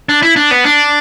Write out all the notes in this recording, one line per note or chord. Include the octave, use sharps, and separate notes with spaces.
D4
E4
D4
B3
D4